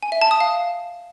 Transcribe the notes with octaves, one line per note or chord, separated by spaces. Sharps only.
G#5
E5
A5
D#6
F5